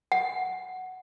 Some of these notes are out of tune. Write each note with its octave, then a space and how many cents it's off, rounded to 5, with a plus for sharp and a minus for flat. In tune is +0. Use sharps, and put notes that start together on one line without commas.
F#5 +5